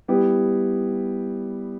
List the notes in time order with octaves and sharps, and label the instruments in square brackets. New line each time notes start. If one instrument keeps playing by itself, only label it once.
[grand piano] G3 B3 E4 G4